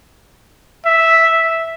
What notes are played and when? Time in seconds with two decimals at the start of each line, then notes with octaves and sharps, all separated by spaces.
0.85 E5